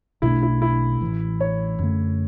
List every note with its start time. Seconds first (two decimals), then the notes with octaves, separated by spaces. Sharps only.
0.22 B1 B2 A3 D4 E4
0.42 E4
0.62 E4
1.01 A1 A2 E3
1.41 C#5
1.79 F#2 D3 A3